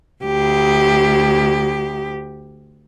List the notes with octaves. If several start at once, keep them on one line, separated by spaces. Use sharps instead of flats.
D2 G4